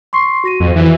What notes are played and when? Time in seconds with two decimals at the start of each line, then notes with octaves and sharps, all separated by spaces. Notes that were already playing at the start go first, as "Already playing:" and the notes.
0.13 C6 C#6 C7
0.44 F#4 A#6 D#7
0.60 F2
0.76 E3